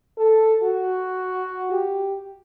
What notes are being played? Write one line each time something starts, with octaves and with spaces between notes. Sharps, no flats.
A4
F#4
G4